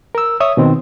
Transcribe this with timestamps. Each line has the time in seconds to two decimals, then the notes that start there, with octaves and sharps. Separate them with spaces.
0.15 A#4 E6
0.40 C#5 E5 D#6
0.57 B2 D#3 C4